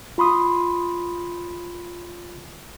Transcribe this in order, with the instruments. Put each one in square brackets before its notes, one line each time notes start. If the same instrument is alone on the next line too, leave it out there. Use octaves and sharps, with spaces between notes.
[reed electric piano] F4 B5 C6 D#6